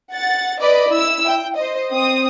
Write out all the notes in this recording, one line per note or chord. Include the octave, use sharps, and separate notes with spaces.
F#5 A6
B4 D5 D#5 B5 D6
E4 E6
G5
C5 D#5
C4 D#6